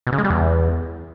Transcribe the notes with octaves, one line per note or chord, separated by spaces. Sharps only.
B2
C#3
G#3
G3
E2